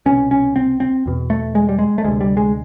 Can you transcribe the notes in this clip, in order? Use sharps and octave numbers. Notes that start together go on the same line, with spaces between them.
C2 B2 C#4
C#4
C4
C4
E2 B2
A3
G#3
G3
G#3
A3
D2 C3 G#3
G3
G#3